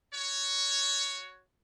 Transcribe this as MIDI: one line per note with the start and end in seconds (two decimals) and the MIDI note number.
0.13 1.41 66
0.13 1.41 73